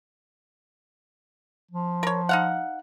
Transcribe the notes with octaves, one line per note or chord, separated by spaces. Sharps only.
F3
A#4 C#5
D#4 F5 F#5